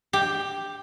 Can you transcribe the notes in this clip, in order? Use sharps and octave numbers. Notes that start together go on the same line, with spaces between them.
G4